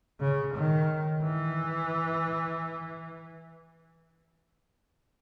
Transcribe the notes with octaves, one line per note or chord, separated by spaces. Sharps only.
C#3
D#3
E3